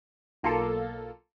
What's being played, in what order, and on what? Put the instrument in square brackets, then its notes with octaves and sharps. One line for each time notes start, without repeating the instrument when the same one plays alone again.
[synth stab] B1 A#3 F4 A4